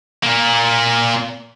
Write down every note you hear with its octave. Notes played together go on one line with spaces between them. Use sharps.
A#2 A#3